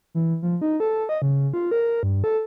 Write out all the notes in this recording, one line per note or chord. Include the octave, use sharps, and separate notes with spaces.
E3
F3
D#4
A4
D#5
C#3
F4
A#4
G2
A4